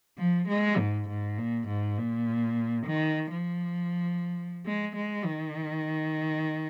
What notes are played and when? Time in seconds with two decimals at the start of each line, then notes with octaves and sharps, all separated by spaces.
0.18 F3
0.48 G#3
0.78 G#2
1.08 G#2
1.38 A#2
1.67 G#2
1.97 A#2
2.86 D#3
3.32 F3
4.65 G#3
4.96 G#3
5.25 D#3